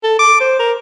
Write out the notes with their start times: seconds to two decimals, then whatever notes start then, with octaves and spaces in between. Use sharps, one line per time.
0.03 A4
0.19 D6
0.40 C5
0.59 A#4